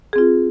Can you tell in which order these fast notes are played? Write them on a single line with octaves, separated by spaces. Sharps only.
G#4 C4 F4